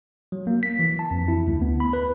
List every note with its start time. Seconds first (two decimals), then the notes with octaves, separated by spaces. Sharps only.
0.32 F#3
0.47 A#3
0.63 B6
0.79 E3
0.99 A5
1.11 F2
1.28 E4
1.47 D2
1.62 B3
1.80 B5
1.93 B4